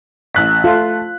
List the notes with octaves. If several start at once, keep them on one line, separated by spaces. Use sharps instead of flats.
A1 F#6 B6
A3 F4